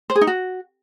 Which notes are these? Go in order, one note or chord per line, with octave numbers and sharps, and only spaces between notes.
C5
G#4
D#4
F#4